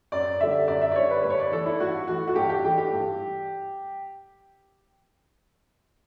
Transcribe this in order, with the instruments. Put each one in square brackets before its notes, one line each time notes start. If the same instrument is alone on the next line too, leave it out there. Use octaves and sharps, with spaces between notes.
[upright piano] F#2 D5
D3 G3 E5
F#2 D5
E5
D5
D3 G3 C#5
B4
G2 B4
C#5
D5
E3 A3 A4
E4
G2 F#4
E3 A3 F#4
F#4
G2 G4
G4
E3 A3 G4
G4
G2